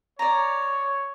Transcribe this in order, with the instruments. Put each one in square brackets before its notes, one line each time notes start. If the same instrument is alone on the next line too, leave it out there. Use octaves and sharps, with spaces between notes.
[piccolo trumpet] C#5 [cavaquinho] D5 A#5